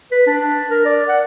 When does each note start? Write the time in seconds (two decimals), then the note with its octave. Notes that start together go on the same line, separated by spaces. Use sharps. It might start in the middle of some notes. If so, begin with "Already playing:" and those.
0.11 B4
0.27 D4
0.70 A#4
0.85 D5
1.08 F#5